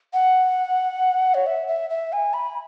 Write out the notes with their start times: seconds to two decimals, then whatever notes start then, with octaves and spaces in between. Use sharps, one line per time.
0.13 F#5
1.34 C#5
1.46 E5
1.68 E5
1.90 E5
2.13 G#5
2.34 B5